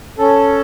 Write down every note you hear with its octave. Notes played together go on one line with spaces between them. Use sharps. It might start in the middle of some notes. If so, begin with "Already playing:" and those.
C#4 A4